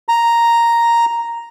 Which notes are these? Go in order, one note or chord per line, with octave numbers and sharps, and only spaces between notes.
A#5